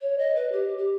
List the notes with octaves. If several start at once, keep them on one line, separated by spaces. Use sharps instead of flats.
C#5
D#5
B4
G4
G4